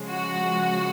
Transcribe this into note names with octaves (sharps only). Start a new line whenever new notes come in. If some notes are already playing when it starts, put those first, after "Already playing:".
Already playing: C#3 F3 G#3
F#4